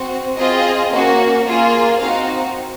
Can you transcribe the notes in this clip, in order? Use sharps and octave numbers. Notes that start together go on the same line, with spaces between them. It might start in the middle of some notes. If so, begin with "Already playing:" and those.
Already playing: C4 F#4
C4 F4 G#4 D#5
A#3 C#4 F#4
A#3 F4 G#4
C4 D#4 F#4 F5